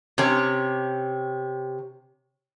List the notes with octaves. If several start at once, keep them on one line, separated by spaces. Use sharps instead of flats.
C3 C#4